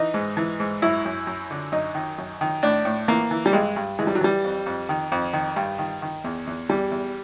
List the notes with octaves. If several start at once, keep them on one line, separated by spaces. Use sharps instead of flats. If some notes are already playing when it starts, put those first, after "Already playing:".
Already playing: E3 D#4
G#2
E3
G#2
F#2 E4
F#2
F#2
D3
F#2 D#4
D#3
F#2
D#3
A2 D4
A2
E3 A#3
E3
G3
G2 G#3
G2
E3 G#3
G3
F#3
E3 G3
F2
F2
D#3
F2
D#3
G2
D#3
D#3
E2
E2
E2 G3
E2